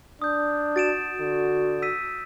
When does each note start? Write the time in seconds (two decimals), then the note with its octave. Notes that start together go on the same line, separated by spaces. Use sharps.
0.22 D4 D#6 G6
0.76 F#4 A6 D7 E7
1.20 D3
1.82 E6 B6 D#7